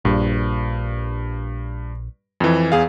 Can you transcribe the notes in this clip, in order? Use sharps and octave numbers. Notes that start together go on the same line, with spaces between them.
A#1 G2
F2 E3
E2 G#4 F5